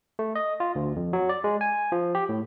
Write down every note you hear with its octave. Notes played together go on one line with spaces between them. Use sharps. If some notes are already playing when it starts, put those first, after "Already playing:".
A3
D#5
F4
D2
F2
F#3
D5
G#3
G#5
F3
G4
A2